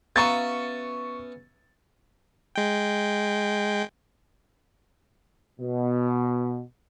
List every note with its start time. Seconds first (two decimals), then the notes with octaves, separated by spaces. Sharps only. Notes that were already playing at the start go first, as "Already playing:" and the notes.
0.16 B3 C#4 F#4 E5 F5 A#5 C#6 A6
2.55 G#3 G5
5.60 B2